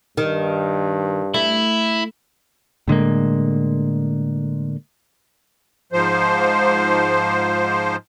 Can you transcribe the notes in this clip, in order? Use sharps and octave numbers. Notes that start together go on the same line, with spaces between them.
G2 D#3
A3 E4
A2 D3 G#3 A#3
G#2 F3 C5